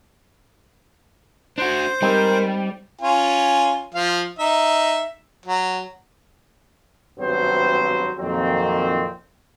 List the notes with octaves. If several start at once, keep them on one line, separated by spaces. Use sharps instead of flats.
D4 F#4 C5
G3 G#3 C4 D#4 A#4
C#4 F4 G#5
F3 F5
D#4 E5
F#3
G#1 G2 F#3 B3 C4 C5
F2 A#2 D#3 F#3 A#3 C4